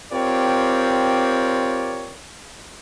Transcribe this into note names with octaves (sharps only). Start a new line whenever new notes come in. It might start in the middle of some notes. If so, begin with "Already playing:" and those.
C4 F4 G4 A#4 C#5 D5